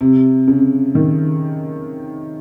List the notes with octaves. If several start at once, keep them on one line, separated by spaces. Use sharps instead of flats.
C3
C#3
D#3